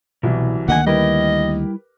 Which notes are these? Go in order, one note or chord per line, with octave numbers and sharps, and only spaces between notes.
C2 B2 E3 F#3
D2 D3 D#3 A#3 D#5 F#5 G#5
G3 E4 G4 A#4 B4 D#5